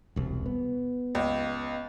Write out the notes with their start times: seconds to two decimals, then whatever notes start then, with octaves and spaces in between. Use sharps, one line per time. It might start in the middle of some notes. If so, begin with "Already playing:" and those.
0.16 E1 C2
0.46 B3
1.15 C#2